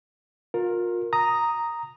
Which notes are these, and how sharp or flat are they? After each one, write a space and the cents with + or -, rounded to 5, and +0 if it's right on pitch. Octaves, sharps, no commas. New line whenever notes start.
F4 +35 A#4 +0
A#5 +0 D#6 +0